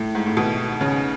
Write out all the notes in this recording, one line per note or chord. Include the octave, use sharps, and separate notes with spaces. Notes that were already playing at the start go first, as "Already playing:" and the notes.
Already playing: A2
G#2
A2
B2
C#3